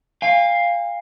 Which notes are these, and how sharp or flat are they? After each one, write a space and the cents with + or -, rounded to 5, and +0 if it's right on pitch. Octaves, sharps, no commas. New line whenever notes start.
F5 +0 G#5 -45